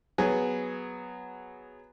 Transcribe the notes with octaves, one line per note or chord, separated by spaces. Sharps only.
F#3 B3 G#4